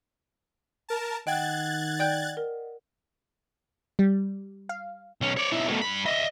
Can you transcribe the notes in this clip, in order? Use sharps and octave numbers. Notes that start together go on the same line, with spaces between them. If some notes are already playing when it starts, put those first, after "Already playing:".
A#4 A5
D#3 D#5 F#5 G5 F#6 G#6 A6
D5 G5 G6
A#4
G3
F5
B1 C#4
C#5 D5
B1 E4
B2 A3
G2 B5
D#5 E5